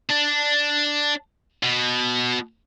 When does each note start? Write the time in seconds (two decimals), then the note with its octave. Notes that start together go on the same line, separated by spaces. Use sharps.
0.10 D4
1.63 B2